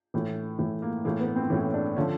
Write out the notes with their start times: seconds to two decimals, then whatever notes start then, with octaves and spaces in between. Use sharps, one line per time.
0.14 A2 E3
0.59 A2 E3
0.82 A#3
1.05 A2 E3 A#3
1.20 B3
1.36 C4
1.50 A2 E3 C#4
1.74 D4
1.97 D3 F3 C#4